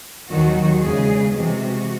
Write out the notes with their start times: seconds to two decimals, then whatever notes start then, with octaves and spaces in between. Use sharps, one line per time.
0.29 D#2 D#3 F#3 F#4
0.81 E2 C#3 G#3 G#4
1.33 C3 E3 G#3 F#4